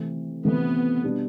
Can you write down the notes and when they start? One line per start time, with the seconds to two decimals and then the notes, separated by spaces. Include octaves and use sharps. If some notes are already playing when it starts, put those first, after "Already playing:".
Already playing: C3 E3 A3 C4
0.44 C3 E3 A3 B3 C4
1.04 B2 G3 D4